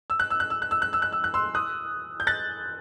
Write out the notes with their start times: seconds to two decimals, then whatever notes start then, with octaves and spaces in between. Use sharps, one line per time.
0.10 E6
0.20 F#6
0.30 E6
0.40 F#6
0.50 E6
0.62 F#6
0.71 E6
0.82 F#6
0.93 E6
1.02 F#6
1.13 E6
1.24 F#6
1.34 C6 E6
1.55 D#6 F#6
2.20 G6
2.27 F#6 A6